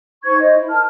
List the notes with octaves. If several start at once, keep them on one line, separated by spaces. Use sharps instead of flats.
D#4 C5 C#6 G#6
C5 D#5
E4
A#4 A5 F6